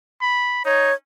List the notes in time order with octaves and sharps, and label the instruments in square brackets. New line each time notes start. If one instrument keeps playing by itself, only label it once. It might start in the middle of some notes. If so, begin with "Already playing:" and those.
[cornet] B5
[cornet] D#4 [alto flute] C#5